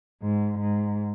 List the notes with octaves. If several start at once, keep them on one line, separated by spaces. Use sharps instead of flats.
G#2
G#2